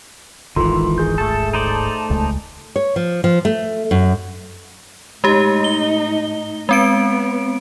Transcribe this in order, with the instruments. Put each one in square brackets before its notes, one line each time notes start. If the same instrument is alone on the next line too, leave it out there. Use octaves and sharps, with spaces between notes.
[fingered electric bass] D1 G#1 G#2 [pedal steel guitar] D#3 E3 [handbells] F4 A4 C6
[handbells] G#4 G6
[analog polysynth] A3 A5 [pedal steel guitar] A4
[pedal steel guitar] D#4 C5 D5
[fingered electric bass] D#1 C#2 G#3
[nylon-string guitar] C#5
F3
F3
A3
F#2
[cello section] A2 D#4 [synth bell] G#3 G4
[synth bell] G7
[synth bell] G#3 C4 D7 [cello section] B3